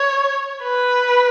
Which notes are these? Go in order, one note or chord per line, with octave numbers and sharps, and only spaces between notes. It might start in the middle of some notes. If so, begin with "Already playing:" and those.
Already playing: C#5
B4